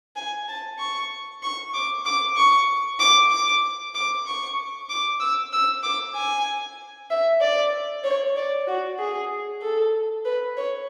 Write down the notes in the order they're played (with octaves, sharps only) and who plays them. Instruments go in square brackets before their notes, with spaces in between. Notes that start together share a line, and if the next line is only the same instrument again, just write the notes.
[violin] G#5
A5
C#6
C#6
D6
D6
C#6
D6
D6
D6
C#6
D6
E6
E6
D6
G#5
E5
D5
C#5
D5
F#4
G#4
A4
B4
C#5